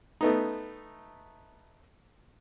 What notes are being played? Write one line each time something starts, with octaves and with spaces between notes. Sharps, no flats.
A3 B3 D#4